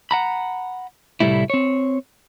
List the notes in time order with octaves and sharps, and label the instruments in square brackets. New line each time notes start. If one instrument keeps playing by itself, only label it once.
[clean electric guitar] F#5 A#5 B5
C2 A2 G3 A3 E4
C4 C#5